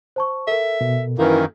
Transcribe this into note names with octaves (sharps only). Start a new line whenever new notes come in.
C5 A5 C#6
A4 A#4 E5
B2
F#2 D#3 E3 A#3 E4 B4